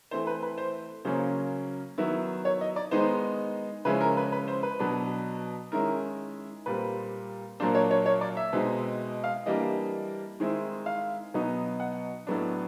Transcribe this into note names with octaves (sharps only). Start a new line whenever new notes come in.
E3 A3 C4 C5
B4
B4
C5
C#3 F#3 A#3 C#4 C5
D#3 F#3 B3 E4
C#5
D#5
D5
D#3 G#3 B3 D#4 C5
C#3 F3 G#3 C#4 E4 B4
A#4
B4
B4
C5
B4
B2 F#3 B3 D4
D#3 G#3 C#4 E4 A#4
A#2 G3 C4 B4
A#2 F#3 A#3 D4 C5
C#5
C#5
C#5
D5
E5
B2 G#3 C4 D#4
F5
E3 G3 A#3 D4 D#5
D#3 G#3 C4 E4
F5
B2 F#3 B3 D#4
F#5
A2 F#3 B3 D4